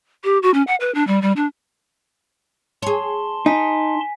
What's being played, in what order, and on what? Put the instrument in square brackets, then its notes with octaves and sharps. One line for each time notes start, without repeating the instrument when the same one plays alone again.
[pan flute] G4
F#4
C#4
F#5
B4
D4
G3
G3
D4
[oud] G#4 C#5 [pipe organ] A5 C6
[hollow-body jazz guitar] D#4 [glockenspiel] G#5 B6